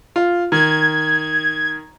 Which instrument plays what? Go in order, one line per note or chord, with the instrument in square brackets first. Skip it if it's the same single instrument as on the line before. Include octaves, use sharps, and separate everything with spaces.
[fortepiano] F4
[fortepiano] D#3 [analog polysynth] G#6